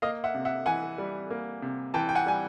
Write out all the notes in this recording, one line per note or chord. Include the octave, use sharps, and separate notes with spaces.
A#3 D#5 F5
E5 F#5
C3
E5 F#5
E3 F#5 G#5
G3
A#3
C3
E3 G5 A5
G5
F#5 G#5
G3 G#5